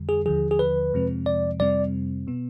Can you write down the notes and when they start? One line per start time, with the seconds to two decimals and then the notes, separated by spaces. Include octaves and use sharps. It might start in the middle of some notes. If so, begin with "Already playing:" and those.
Already playing: F2 D3 G3
0.09 G#4
0.26 D#2 D3 F3 G#4
0.51 G#4
0.59 B4
0.93 F2 C3 F3 G#3 C4
1.26 D5
1.60 F2 C3 G3 C4 D5
2.27 B2 B3